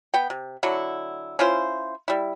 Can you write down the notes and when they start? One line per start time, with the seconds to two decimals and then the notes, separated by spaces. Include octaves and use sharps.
0.14 B3 G5
0.30 C3
0.63 D3 F#3 E4
1.39 C#4 E4 F4 C5
2.08 G3 E4